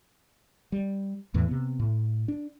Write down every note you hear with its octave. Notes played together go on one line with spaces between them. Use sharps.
G3
E2 A2 E3
C3 B3
A2
D4